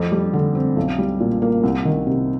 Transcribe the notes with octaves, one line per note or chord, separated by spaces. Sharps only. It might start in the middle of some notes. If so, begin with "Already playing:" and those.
Already playing: F2 C4
G3
D3
C4
B1
G3
A#2
A#3
C2
D#3
C3